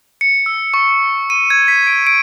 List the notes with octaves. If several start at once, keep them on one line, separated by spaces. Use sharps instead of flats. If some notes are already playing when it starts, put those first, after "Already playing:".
C#7
E6
C#6
D#7
G#6
B6
D7
D7